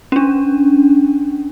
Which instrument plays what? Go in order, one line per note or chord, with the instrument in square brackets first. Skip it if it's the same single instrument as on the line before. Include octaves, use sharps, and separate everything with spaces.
[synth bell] C#4 D4